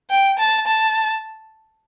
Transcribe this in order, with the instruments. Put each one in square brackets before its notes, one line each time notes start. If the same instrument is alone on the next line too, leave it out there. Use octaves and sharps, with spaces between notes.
[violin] G5
A5
A5